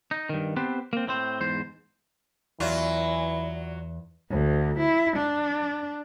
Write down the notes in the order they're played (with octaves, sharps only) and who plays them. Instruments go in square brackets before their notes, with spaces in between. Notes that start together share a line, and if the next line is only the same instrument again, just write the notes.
[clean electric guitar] D#4
G2 D#3
B3 C4 G4 B4 C5
A#3 C4
A2 C4 C5
E2 G#2 C5
[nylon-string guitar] E2 [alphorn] E3 [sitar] F#3 F4 [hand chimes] D5 E5
[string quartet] D2
E4
D4